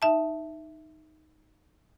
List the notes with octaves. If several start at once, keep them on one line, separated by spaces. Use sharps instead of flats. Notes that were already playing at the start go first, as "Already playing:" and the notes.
D#4 E5 A5